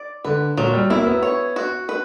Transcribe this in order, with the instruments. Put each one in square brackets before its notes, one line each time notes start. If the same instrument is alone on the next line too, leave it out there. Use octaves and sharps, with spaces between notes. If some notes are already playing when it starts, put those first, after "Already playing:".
Already playing: [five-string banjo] D5
[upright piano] D3 [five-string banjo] B4
[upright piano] A#2 [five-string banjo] F#3
[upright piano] G3
[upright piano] A#3 [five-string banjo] E4
[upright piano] B3
[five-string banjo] C#5
F#4
B4